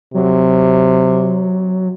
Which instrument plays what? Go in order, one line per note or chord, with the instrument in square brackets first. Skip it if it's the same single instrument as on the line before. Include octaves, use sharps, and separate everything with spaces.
[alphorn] C3 [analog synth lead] F#3